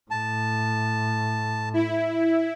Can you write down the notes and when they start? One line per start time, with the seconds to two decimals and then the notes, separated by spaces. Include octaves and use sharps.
0.11 A2 A5
1.74 E4